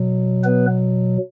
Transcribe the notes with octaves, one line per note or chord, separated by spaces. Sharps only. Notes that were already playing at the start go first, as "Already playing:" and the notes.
Already playing: B2 F#3
B3 B4